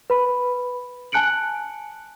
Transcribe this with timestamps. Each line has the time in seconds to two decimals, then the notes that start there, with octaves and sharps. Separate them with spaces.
0.10 B4 B5
1.12 G#5 A5 F#6 C#7 D7 F#7